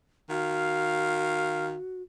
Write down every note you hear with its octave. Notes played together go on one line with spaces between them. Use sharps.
D#3 F#4 F5